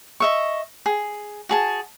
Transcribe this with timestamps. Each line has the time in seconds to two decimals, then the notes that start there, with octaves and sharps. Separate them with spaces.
0.20 D#5 E5 C#6
0.86 G#4
1.49 F#4 G#4 A5